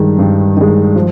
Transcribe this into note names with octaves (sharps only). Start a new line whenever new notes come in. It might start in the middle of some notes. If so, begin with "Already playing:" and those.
Already playing: G2 D#3 G#3
G2
D#3 G#3
F3